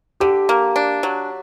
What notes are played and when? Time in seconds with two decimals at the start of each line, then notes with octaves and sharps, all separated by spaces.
0.20 D3 G4
0.49 A#3
0.76 D4
1.03 F#3